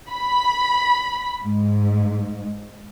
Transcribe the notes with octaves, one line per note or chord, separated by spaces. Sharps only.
B5
G#2